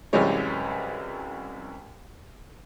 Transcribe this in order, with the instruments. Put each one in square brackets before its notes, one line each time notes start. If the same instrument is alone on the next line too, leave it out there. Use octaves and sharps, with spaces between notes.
[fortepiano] C2 F#2 E3 G3 G#3 C#5